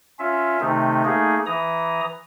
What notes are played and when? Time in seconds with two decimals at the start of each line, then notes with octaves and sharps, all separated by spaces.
0.19 C#4 F4 E5
0.61 C3 D#3 A3 D#4
1.05 A3 A#3 D#4 G#4
1.46 E3 A#5 D#6